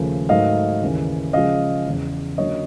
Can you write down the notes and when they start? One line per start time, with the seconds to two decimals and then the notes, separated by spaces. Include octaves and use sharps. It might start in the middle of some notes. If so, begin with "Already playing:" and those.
Already playing: D#2 C#3 F3 A3
0.29 G#2 D#3 F#3 A3 D#5 F5
0.82 D#2 C#3 E3
1.33 C#3 F3 G#3 C#4 D#5 F5
1.86 E2 C#3 E3
2.38 D3 F#3 A#3 C#4 C#5 D#5